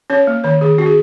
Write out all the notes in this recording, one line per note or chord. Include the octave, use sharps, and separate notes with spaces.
C#4 C#5
A#3
D#3 C#5
D#3 G#4
C#4 F#4
G#4